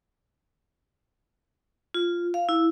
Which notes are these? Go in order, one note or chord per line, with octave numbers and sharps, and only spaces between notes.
F4
F5
E4